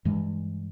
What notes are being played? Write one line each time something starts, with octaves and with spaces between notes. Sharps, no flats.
G2 E3 G#3